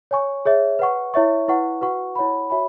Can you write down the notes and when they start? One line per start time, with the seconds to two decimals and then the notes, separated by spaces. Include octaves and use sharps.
0.11 C#5 G#5 C#6
0.45 G#4 C#5 E5
0.79 B4 F#5 C#6
1.14 E4 C#5 E5 C#6
1.48 E4 B4 F#5 C#6
1.81 F#4 B4 F#5 C#6
2.15 E4 C#5 F#5 B5
2.50 F#4 C#5 E5 G#5 B5